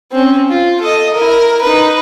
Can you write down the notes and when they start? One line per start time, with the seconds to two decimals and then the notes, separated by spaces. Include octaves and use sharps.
0.12 C4 C#4
0.49 F4
0.81 A4 D#5
1.13 E4 A#4
1.62 D#4 B4